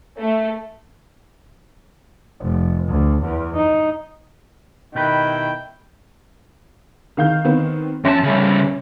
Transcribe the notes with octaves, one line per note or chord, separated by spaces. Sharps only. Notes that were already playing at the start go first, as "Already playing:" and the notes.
A3
F1
D2
E2
D#4
B2 D#3 E4 G4 B4 G5
D#3 F5 G6
D#3 B3 C4
F2 C#4 E5 A5 C6
C#3 G3